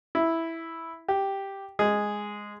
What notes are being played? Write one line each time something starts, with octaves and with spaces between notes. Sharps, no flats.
E4
G4
G#3 G#4